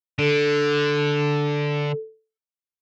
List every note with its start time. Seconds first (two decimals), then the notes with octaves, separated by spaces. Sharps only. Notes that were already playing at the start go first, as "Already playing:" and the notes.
0.19 D3 A4